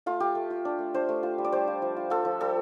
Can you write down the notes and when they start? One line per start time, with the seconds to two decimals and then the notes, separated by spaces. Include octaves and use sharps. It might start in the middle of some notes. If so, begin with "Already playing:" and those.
0.06 A3 F4
0.20 F4 G4
0.35 A3
0.50 F4
0.65 D4
0.79 A3
0.94 D4 C5
1.09 A3
1.23 F4
1.38 G3
1.45 D5
1.52 G3 C5
1.67 F4
1.82 F3
1.97 F4
2.10 F4 A4
2.25 F3
2.40 G3 A4